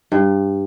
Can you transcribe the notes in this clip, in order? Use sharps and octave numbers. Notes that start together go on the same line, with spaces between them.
G2